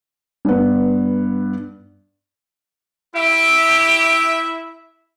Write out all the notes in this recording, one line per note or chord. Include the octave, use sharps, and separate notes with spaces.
G2 B3
E4 G4 E5